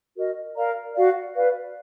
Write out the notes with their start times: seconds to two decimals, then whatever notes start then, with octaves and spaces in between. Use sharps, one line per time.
0.17 F#4 A#4 D#5
0.56 A#4 D5 F5 A#5
0.95 F#4 D5 F5
1.34 B4 D5 F5